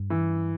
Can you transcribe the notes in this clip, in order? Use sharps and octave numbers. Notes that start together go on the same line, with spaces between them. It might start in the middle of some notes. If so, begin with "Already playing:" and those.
Already playing: G2
E3